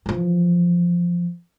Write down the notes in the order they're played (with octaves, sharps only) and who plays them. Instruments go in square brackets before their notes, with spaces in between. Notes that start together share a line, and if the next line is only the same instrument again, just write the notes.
[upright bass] E3 F3